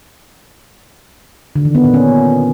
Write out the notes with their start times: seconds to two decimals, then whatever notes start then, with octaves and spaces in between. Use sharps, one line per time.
1.56 D3
1.65 D#3
1.75 B3
1.84 A#2
1.94 C#4